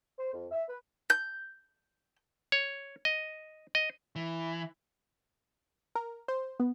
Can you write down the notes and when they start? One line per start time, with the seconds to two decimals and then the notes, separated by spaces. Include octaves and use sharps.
0.18 C5
0.33 F2
0.51 E5
0.69 B4
1.10 G6
2.52 C#5
3.05 D#5
3.75 D#5
4.16 E3
5.95 A#4
6.28 C5
6.60 B3